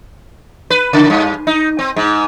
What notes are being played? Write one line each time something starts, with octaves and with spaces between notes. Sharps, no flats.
B4
C#3
G2
D#4
C4
G#2